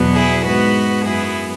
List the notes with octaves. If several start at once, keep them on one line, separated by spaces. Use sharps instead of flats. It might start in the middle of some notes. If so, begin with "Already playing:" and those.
Already playing: E2 B2 F#3 B3
E4 G#4
G#2 G#3 B3 F#4 B4
F#2 F#3 B3 E4 G#4